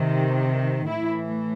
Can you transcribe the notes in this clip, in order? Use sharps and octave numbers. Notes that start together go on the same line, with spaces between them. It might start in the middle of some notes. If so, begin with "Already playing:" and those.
Already playing: C3 D#3
A2 E3 E4